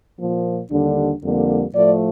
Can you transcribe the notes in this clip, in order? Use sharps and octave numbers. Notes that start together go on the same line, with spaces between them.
A#2 F3 A#3
D#2 D3 G3 D4
F2 D3 G3 A#3
A2 F3 A3 D5